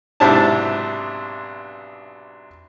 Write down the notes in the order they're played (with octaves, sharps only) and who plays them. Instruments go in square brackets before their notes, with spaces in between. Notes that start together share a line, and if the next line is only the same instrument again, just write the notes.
[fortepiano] B1 G#2 C3 D4 E4 A5